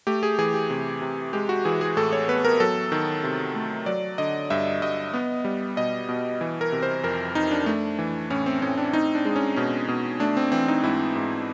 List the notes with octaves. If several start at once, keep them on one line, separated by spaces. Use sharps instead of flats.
A3 G4
G#4
E3 G#4
G4
C3
C3
G#3 G4
F#4
E3 G#4
G#4
A2 A4
C#5
B3 B4
A#4
F#3 A4
D#3
C3
A3
F#3 D5
D3 D#5
G2 E5
G2 D#5
B3
G3
B2 D#5
B2
E3
A#4
C3
C5
F2 A#4
F2 D#4
D4
A3
E3
A2 C#4
C4
A2 C#4
D4
C4 D#4
D4
G#3
C#4
B2 C#4
B2
A3 D4
C4
E3 C4
D#4
G#2 E4
G#2